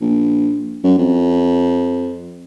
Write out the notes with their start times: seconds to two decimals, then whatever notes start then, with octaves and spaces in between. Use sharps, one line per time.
0.01 A#1
0.84 F#2
0.98 F2